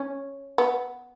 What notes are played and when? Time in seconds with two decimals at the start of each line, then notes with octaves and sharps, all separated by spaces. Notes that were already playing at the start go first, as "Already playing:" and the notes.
Already playing: C#4
0.58 B3